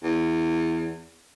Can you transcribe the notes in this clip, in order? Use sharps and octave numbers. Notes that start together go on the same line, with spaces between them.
E2